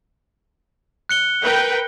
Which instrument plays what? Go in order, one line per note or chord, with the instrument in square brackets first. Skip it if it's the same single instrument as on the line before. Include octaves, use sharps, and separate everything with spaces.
[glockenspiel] F#6 C#7 G7
[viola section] A#4 B4 G5